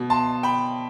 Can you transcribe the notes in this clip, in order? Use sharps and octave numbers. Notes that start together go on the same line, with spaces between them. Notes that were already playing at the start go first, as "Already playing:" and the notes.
Already playing: B2
A5 C6
G5 B5